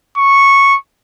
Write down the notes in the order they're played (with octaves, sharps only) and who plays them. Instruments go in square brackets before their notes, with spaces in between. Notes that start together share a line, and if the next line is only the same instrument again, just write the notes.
[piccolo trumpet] C#6